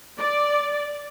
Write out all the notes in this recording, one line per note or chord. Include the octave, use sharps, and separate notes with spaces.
D5